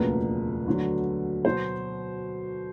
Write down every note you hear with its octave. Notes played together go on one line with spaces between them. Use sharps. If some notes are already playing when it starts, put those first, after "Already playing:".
Already playing: E1 D2 C#3 F3 A#3 B4
D2 D3 F#3
B2 F#3 C5